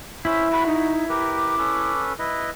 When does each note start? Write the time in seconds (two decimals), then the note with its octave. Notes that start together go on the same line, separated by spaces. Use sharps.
0.25 C#4 E4 C5 E5
0.52 F#4 B5
0.67 D#4
1.09 G4 A#4 B4 D6
1.58 C#4 A4 B4
2.19 E4 B4 D#5